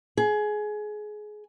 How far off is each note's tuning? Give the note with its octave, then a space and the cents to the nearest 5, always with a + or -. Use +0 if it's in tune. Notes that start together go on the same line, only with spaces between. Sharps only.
G#4 +20